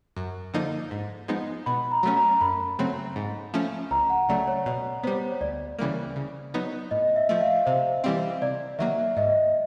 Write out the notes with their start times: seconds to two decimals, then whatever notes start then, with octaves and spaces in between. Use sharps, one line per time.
0.16 F#2
0.54 D3 F3 A#3 D#4
0.91 G#2
1.28 F3 G#3 B3 D#4
1.66 B2 B5
1.91 A#5
2.03 F#3 A3 C#4
2.16 A#5
2.41 F#2 B5
2.79 C#3 F#3 A3 C4
3.16 G#2
3.54 F3 A3 C#4
3.91 C#2 A#5
4.10 F#5
4.29 C#3 F#3 A3 D5
4.48 C#5
4.66 B2 C#5
5.03 G3 B3 C5
5.32 C#5
5.41 D2 D5
5.79 C#3 E3 G3 A#3
6.16 C#3
6.54 F#3 B3 D#4
6.91 A2 D#5
7.16 E5
7.29 F3 A3
7.41 F5
7.66 C3 C5
8.04 E3 G3 C4
8.42 C3 D5
8.79 D#3 F#3 A#3 E5
9.17 G#2 D#5